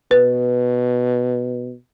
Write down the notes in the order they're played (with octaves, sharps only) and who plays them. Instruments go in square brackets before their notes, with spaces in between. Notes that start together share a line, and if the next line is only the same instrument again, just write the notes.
[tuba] B2 [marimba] B4